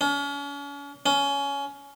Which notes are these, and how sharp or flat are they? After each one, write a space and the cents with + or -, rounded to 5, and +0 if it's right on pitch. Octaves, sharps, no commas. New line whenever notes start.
C#4 +40
C#4 +20